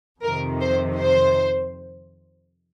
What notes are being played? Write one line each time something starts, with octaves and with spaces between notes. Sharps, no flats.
F2 C3 D#3 A#4
C5
C5